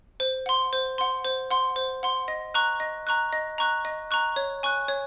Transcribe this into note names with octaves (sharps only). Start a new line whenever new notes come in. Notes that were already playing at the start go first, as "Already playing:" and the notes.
C5
F#5 C6
C5
F#5 C6
C5
F#5 C6
C5
F#5 C6
D#5
A#5 C#6 F#6
D#5
A#5 C#6 F#6
D#5
A#5 C#6 F#6
D#5
A#5 C#6 F#6
C#5
G#5 C#6 F#6
C#5